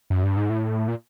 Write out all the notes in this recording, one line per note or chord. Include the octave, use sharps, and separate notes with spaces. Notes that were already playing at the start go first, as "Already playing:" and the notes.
F#2
G2
G#2
A2
A#2